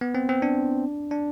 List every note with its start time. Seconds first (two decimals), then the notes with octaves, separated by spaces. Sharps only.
0.01 B3
0.15 C4
0.29 C4
0.42 D4
1.11 D4